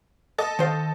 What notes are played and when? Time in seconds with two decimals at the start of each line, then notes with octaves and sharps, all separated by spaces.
0.38 A4 D#5
0.59 D#3 C5 F5